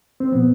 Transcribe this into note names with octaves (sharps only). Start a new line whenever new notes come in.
C4
A#2 F3 B3